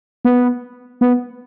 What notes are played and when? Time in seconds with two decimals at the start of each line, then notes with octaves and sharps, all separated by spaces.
0.25 B3
1.01 B3